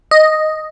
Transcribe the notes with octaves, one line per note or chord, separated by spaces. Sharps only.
D#5